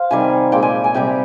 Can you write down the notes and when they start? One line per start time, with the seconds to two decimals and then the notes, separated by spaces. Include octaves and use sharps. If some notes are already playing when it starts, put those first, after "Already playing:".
Already playing: C5 F5
0.11 C3 D#3 G3 G#5
0.52 A#2 F3 G#3 G5
0.63 G#5
0.84 G#5
0.94 C3 G3 G5